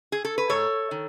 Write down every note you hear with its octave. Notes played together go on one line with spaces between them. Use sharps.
G#4
A4
B4
G#2 A4 C#5
D#3